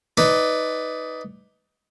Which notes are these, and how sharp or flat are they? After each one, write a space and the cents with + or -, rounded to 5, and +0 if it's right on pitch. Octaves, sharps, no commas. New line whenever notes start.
D#4 +15 B4 +10 D5 +0